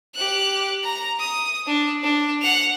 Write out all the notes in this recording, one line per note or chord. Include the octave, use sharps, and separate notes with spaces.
G4 F#6
A#5
D#6
D4
D4
F#5 F7